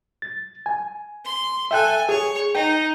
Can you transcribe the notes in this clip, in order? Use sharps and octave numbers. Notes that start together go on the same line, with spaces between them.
A6
G#5
C6
A4 E5 G5 G#5 F#6
G#4 C#5
D#4 G5